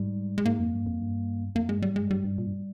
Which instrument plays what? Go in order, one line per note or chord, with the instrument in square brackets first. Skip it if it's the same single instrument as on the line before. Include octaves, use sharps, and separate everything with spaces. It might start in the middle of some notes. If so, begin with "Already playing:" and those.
Already playing: [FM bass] G#2 [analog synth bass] G3
[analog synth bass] G#3
[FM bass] G#2 [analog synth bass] A#3
[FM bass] F2
G2
F2
G2
[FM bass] F2 [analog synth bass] A#3
[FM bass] G2 [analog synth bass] G#3
[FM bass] G#2 [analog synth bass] G3
[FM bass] G2 [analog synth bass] G#3
[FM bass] G2 [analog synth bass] G3
[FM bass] G2
A#2
G2